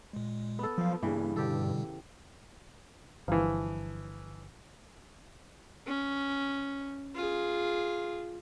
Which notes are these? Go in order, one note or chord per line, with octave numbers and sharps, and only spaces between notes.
A#2 G#3
B3 A4
F3 F#3 F5
G2 C#3 E3 A#3
B2 D3 G3 G4 A4
G1 E3 F3
C#4
F4 G#4